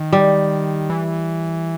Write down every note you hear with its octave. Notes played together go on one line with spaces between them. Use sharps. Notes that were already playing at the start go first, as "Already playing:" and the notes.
Already playing: D#3
G3
E3